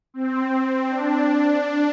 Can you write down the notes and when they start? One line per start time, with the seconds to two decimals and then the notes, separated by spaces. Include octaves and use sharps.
0.14 C4
0.89 D4